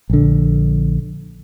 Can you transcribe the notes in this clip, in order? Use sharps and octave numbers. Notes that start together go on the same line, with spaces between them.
A#1 D3